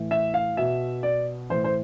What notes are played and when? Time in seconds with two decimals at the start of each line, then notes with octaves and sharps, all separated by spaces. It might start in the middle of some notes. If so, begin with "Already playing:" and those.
Already playing: A2 E3
0.11 E5
0.34 F5
0.57 B2 E5
1.03 D5
1.50 A2 E3 C5
1.64 C5